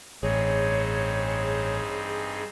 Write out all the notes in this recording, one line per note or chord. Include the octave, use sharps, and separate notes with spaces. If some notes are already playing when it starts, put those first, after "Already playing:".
A1 G2 C4 D#4 G#4 C#5